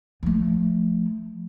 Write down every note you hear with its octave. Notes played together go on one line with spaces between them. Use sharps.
F3 A3